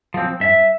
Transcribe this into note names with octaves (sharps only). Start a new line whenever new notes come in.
F3 C4
G2 E5